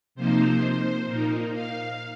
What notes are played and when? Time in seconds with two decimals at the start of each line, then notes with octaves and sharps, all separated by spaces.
0.15 C3 F3 A#3 D#4 C5
1.06 A#2 A#3 D#4
1.53 F5